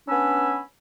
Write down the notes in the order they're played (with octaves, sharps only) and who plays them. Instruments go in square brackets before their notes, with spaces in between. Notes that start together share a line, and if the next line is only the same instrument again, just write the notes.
[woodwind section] B3 C#4 D4 G#5 B5 E6